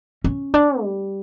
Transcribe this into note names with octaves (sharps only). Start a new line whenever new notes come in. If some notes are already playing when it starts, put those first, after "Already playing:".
C#4
D4
G3